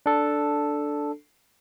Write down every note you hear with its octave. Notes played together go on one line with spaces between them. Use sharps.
D4 A4